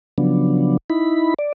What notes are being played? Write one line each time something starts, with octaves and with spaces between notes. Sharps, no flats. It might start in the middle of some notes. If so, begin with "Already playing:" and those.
C#3 F3 F#3 B3 D4
D#4 E4 B5
D5